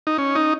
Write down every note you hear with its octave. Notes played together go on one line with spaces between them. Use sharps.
D#4
C#4
D#4